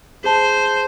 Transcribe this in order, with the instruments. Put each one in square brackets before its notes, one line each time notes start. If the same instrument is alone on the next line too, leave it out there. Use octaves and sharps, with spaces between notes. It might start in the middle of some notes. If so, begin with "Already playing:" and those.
[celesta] G#4 A5 [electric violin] C5